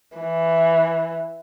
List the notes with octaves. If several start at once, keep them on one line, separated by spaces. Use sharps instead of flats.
E3